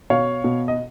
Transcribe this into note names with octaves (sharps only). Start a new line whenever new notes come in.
B2 C#5 F5
B2
D#5